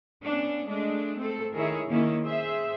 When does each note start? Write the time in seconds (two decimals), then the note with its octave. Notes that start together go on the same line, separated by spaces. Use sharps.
0.22 B3 C#4 D4
0.67 G#3 A3 D4 D#5
1.18 A3 C4 A4
1.54 D#3 E4 G#4 A#4 C#5 E5
1.87 D#3 A#3 C#4 E4
2.26 G#4 C5 E5